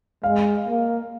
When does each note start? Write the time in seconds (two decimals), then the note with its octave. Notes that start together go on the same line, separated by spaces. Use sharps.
0.23 G#3 F5
0.68 A#3